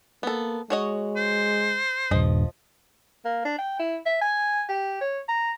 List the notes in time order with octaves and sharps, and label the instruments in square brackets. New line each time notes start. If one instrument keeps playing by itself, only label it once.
[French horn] A#3 [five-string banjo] B3 A4
[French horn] G#3 [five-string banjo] F#4 C#5 D#5
[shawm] C5
[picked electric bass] D#1 G2 [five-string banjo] F3 D#5
[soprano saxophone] A#3
D4
G5
E4
E5
G#5
G4
C#5
A#5